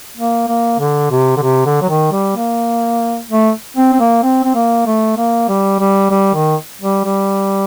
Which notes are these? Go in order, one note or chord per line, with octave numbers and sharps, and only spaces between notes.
A#3
A#3
D3
C3
D3
C3
D3
F#3
D#3
G3
A#3
A3
C4
C4
A#3
C4
C4
A#3
A3
A#3
G3
G3
G3
D#3
G3
G3